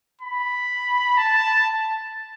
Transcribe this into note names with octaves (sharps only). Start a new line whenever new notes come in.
B5
A5